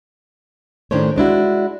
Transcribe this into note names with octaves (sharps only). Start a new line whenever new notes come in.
A2 D#3 C#4 D4 C5 C#5
G#3 D4 E4 F#4